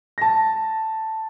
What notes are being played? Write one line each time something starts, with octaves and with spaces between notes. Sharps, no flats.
A5 A#6